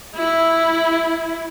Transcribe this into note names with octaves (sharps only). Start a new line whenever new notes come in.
E4